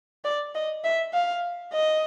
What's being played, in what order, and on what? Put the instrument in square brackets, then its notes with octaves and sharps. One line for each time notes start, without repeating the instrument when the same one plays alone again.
[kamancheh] D5
D#5
E5
F5
D#5